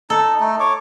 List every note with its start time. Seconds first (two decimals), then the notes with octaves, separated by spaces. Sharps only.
0.10 D#4 A4
0.40 A3 D#4
0.60 C#5 C#6 D6